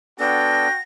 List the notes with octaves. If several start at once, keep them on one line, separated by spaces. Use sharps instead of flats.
B3 D4 F#4 A4 F#5 G5 A#6